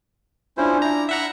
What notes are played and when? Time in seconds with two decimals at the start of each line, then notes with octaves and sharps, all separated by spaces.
0.58 C#4 D4 E4 F4 C5
0.82 E4 A#5
1.09 E5 F#5 A#5